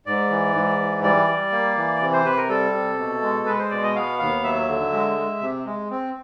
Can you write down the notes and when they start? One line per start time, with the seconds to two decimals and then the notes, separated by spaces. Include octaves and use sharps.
0.06 G#2 D5
0.30 E3
0.54 G#2
0.79 E3
1.03 G3 D5
1.27 G3
1.52 A#3
1.77 E3
2.01 C3
2.13 C5
2.25 C3 B4
2.37 A#4
2.49 G3 A4
2.73 C3
2.98 B2
3.22 G#3
3.46 G#3 B4
3.59 C5
3.70 B2 D5
3.83 D#5
3.95 B3 F5
4.19 D#2 F5
4.43 F#3 E5
4.68 D3
4.92 G#3
5.17 G#3
5.41 C3
5.65 G#3
5.90 C4